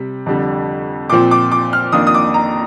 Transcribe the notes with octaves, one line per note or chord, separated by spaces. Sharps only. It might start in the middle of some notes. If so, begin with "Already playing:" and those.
Already playing: C3 G3
F2 D3 G3
A#2 F3 C4 D6
D6
D6
F6
F2 D#3 A#3 D4 D#6
D#6
D6
A#5